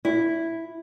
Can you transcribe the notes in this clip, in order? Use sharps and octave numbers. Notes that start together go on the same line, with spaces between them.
E4